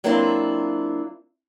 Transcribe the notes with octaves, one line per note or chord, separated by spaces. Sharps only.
F#3 A#3 C4 D4 E4 F4